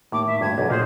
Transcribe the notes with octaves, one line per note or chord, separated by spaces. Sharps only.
D#2 A2 D6
D#2 E5
D2 G2 G#6
E1 B1 F#2
A#2 A#3 D#4 G#4 C5